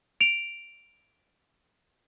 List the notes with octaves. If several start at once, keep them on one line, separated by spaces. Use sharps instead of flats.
D7 F7